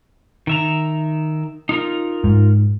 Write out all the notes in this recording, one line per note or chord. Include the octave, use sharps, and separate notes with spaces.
D#3 E5 A#5
D#4 F4 A#4
G#2